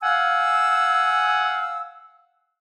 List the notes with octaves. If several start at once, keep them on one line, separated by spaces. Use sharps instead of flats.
F5 F#5 G#5 E6